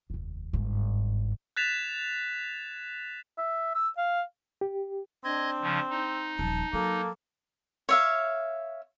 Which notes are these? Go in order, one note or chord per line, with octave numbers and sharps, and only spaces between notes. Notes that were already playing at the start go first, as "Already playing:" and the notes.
F1 D#2
G1 G#2
F#6 G#6 A6 B6 E7 F7
E5
E6
F5
G4
C4 D4 D#5 G#6
C#3 F3
D#4
D#1 F3 A5
F#3 A#3 A4
C#5 E5 F5